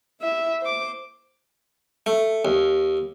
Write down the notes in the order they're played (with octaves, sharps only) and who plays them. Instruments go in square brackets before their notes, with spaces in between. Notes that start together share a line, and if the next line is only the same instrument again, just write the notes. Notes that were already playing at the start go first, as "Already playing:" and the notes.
[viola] E4 E5
C5 D6
[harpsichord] A3
D#2